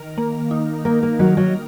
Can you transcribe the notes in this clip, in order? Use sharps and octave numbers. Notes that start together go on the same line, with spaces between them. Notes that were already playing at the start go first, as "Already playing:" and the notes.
Already playing: D#3 A#4
A#3
D#4
A#3 A#4
A#3
D#3 F#3
F#3